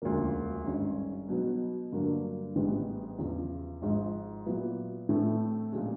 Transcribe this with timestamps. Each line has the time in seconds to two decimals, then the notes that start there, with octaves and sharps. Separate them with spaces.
0.02 E1 D2 C#3 F3 A#3
0.66 G#1 G2 D#3 G#3 C#4
1.29 B2 F#3 B3 D#4
1.92 G2 D3 F#3 A#3
2.56 A1 G#2 E3 G3 B3
3.19 E2 C#3 F3
3.82 G#1 G#2 F3
4.46 A#2 F#3 B3 E4
5.09 A2 E3 A3 C4
5.72 A#2 F3 G#3 C#4